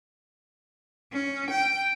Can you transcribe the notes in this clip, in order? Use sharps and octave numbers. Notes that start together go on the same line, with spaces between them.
C#4
G5